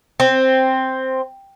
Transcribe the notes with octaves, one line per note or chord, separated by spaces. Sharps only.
C4